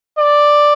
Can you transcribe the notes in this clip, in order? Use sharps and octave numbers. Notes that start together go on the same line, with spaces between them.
D5